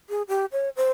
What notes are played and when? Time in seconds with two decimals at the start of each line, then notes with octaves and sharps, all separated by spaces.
0.09 G#4
0.28 G4
0.52 C#5
0.76 C5